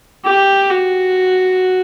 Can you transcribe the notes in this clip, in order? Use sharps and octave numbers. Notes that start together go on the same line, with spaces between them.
G4
F#4